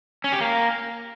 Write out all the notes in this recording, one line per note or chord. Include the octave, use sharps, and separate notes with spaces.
C#4
G4
A#3